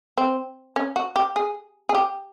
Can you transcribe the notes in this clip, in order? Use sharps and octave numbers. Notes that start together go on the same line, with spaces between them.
C4
C#4
F#4
G4
G#4
G#4
G4